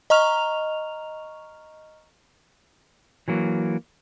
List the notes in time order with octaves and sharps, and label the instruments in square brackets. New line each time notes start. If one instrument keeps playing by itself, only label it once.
[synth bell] D#5 A#5 C#6 F6 F7
[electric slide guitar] E3 F#3 A#3